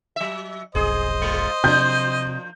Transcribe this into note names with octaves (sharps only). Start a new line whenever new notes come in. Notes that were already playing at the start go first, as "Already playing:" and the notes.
F#3 E5
F1 B1 G#4 C5 D#5
A#2 G#3
C3 F3 A#3 D4 G6